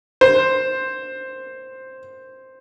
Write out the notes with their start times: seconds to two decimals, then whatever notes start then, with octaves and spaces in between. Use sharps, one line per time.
0.21 C5